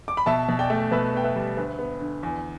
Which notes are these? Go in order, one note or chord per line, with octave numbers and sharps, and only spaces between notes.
D6
B5
B2 E5 A5
B2
D5 G5
A3
B2 B4 E5
B3 G5
B4 E5
G3
D2 B4
B3
D3
E2